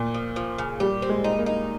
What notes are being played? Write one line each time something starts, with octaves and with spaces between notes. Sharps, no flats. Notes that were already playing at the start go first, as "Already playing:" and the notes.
Already playing: A#2
F3
F3
C#3
G3 G4
C4
G#3
D#4
A#3
D#4